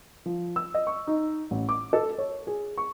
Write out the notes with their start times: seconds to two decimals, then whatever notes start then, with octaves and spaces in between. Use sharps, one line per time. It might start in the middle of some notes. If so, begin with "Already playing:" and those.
0.26 F3
0.56 E6
0.74 D#5
0.87 C#6
1.07 D#4
1.51 A1
1.69 D6
1.93 A4
2.18 C#5
2.47 G#4
2.78 C#6